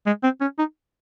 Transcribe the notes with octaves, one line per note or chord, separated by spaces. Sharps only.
G#3
C4
C#4
D#4